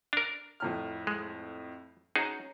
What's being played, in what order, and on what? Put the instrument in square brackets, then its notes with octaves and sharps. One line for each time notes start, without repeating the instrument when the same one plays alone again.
[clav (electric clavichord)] D4 A#4 [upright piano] F7
[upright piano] F2 A2 F6
[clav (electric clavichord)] G#3
[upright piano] C#4 A#5 [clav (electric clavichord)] D#4 F#4 G#4